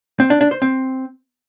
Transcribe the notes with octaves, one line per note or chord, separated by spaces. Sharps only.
C4
D4
D4
C5
C4